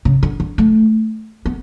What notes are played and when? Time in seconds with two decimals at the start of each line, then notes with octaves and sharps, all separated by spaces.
0.05 C#3
0.23 D3
0.40 D3
0.58 A3
1.46 B3